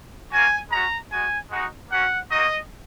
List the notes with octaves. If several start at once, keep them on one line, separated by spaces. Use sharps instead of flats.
A#3 C#4 F#4 G#5
G#3 C#4 F#4 A#5
G#3 F#4 G#5
G#3 D#4 F#4
A#3 C#4 F#4 F#5
A#3 D#4 F#4 D#5